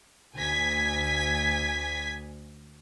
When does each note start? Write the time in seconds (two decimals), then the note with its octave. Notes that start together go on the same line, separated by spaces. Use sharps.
0.36 D2 G#5 G#6 B6